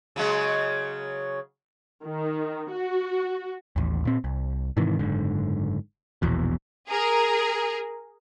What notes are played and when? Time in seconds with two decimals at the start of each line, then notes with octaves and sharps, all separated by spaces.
0.16 C#3 F#3 G#3
2.05 D#3
2.71 F#4
3.76 A1 D#2
4.05 A#2 C4
4.24 C2
4.77 G#2 C3 D#3 E3
4.99 F#1 G#2 D3
6.22 E1 A#1 E2 B2
6.89 G#4 A#4